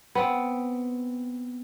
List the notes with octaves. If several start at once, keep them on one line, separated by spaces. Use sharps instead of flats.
B3 C4